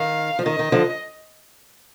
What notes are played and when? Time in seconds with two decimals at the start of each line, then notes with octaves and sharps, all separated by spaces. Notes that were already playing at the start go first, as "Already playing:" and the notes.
Already playing: D#3 F5
0.39 F3
0.46 D#3 D#5
0.59 D#3
0.72 D3 F3